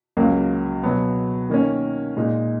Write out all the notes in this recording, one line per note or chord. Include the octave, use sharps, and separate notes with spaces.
C#2 C#3 F#3 A#3
B2 F#3 B3
D#3 A#3 C#4
A#2 G#3 D#4